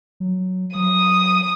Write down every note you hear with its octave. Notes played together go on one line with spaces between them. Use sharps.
F#3
F#3 D#6